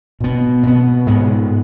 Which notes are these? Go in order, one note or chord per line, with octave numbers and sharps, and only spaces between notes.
B2 B3
B2 B3
G#2 G#3 B3